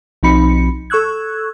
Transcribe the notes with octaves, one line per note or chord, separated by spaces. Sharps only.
B1 F3 C4 D#4 B5 C#7
A4 C#6 E6 F#6 G#6